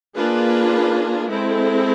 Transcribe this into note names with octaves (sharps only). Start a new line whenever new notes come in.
A#3 D4 F4 G#4 B4
G#3 C4 E4 A4